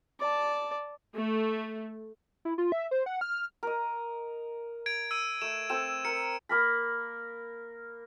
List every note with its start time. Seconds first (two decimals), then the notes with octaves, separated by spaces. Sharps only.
0.20 D5 A5
1.17 A3
2.45 E4
2.58 F4
2.72 E5
2.91 C5
3.06 F#5
3.21 F6
3.63 A#4 D#5
4.86 G#6 D7
5.11 E6 D#7
5.42 A3 E7
5.70 C4 A4 E7
6.05 A#4 C#7
6.49 A#3 A#4 B5